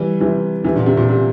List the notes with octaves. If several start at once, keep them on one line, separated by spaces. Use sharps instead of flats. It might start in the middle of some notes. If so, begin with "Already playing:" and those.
Already playing: E3 G3
C3 E3
C3 E3
A#2 D3
C3
A#2
C3